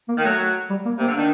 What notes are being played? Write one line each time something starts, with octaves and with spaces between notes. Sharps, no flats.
A#3
D#3
F#3 A3
G3
A#3
C3 A#3
D3
D#3 D4